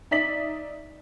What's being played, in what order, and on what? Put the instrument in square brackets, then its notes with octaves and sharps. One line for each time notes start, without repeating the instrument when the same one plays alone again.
[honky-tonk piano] D#4 D5 E5 B6 F#7